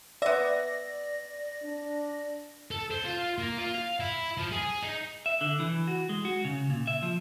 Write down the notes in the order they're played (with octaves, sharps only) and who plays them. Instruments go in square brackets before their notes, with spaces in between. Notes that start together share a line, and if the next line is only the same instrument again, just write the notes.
[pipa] B3 E5 [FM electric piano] D5 A#6
[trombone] D4
[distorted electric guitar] A4
C5
F4
A#3
F4
F5
E4
F3
G#4
D#4
[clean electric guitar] E5
D3
E3
F#4
G#3
F#4
C#3
A#2
E5
F3